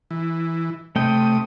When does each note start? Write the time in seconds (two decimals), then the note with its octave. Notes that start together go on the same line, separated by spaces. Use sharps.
0.11 E3
0.96 C3 A3 G5 D#6